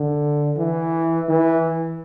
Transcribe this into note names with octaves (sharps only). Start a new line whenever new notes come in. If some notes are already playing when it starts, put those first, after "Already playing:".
Already playing: D3
E3
E3